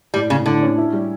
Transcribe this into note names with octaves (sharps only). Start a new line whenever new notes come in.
A2 G3
A2 C#3
A2 D3
C#4
E4
G3